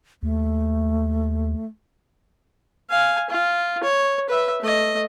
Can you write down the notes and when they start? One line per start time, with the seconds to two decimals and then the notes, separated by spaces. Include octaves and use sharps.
0.23 D#2 A3
2.90 F5 G#5
3.30 F4
3.83 C#5
4.29 B4 E5
4.62 A3 D#5